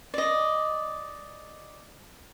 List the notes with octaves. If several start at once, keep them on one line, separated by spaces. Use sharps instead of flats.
D5 D#5